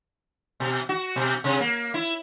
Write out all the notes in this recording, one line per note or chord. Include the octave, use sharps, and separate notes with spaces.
B2
F#4
B2
C3
A#3
E4